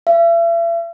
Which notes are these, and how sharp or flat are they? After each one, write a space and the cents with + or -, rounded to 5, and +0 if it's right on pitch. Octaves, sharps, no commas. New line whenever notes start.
E5 +40